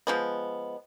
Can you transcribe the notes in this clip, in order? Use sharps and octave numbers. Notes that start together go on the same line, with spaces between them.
F3 G#3 B3